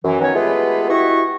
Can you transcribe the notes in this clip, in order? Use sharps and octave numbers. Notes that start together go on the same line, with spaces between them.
F#2 E3
D#3 F#3 B3 C#4 C#5 G#5
G#3 A3 B3 F4 G4 B4
E4 F#4 G4 D#5 C#6